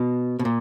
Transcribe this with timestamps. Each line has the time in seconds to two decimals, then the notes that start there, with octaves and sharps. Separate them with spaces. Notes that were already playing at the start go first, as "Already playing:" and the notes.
Already playing: B2
0.39 B2
0.45 A#2